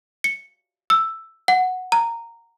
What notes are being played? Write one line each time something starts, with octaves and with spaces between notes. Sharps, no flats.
C#7
E6
F#5
A#5